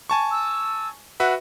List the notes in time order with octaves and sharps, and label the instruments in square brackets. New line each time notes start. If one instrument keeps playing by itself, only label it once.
[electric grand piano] G#5 A5 C#6
[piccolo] E6
[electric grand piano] F#4 B4 E5 [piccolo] F#5